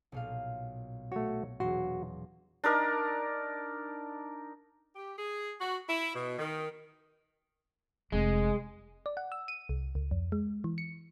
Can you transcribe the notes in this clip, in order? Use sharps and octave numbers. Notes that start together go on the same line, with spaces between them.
B1 A#2 F5
A3 F#4 C#5
E1 F#3 F#4 C6
D4 D#4 A#4
G4
G#4
F#4
E4
B2
D#3
F1 G#3
D5
F#5
E6
D#7
C2
C#2
F2
G#3
E3
C#7